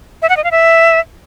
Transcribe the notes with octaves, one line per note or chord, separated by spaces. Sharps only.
E5
F#5
D#5
F5
E5